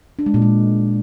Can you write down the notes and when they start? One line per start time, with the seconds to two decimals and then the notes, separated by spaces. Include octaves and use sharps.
0.19 D4
0.26 G#3
0.34 A#2
0.42 G#3